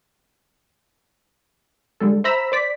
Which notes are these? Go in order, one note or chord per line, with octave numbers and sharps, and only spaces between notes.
D3 G3 G#3 A4
C5 E5 A#5 B5 E6 B6
C5 D5 B6